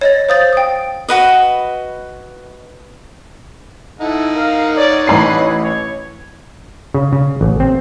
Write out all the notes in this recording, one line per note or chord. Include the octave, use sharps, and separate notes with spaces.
C#5 D#5 A6
C5 F5 D#6 G6 A6
G5 D#6
F#4 B4 D#5
D#4 E4 A4 F#5
A#4 F5
C#5 D5
A1 B4 B5 C7
C#5
C#3
C#3
A1
C4